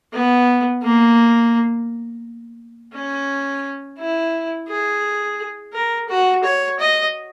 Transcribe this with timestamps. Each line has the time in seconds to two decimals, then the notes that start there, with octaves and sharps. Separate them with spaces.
0.13 B3
0.83 A#3
2.93 C#4
3.99 E4
4.68 G#4
5.73 A#4
6.09 F#4
6.44 C#5
6.79 D#5